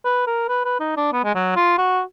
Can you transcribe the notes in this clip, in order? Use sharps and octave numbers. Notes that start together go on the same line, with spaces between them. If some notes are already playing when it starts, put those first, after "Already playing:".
B4
A#4
B4
B4
D#4
D4
B3
G#3
F#3
F4
F#4